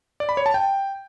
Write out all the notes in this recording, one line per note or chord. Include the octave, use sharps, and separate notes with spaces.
D5
B5
C#5
A5
G5